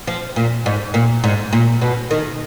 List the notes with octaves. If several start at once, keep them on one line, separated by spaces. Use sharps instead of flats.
F3
A#2
G#2
A#2
G#2
A#2
B2
D#3